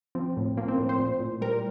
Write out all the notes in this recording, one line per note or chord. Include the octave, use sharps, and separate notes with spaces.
F3 C4
A2
F3 A#3
C4
A2
C5
A#2
A#2
G3 A#4